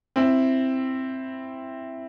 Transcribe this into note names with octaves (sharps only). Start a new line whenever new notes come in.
C4 E4